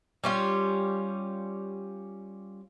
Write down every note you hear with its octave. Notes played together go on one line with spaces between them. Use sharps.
G3 C#4 F4